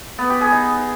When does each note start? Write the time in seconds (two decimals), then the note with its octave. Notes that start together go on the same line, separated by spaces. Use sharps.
0.19 B3
0.30 G4
0.41 G#4
0.52 D#4